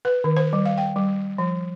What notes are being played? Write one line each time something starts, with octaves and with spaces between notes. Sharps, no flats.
B4
D#3
C5
G3
F5
G5
G3
F3